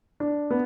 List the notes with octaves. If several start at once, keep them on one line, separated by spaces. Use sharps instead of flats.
D4
B3